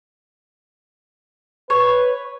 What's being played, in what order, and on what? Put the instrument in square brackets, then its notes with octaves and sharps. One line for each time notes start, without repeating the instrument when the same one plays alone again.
[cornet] B4 [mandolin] C#5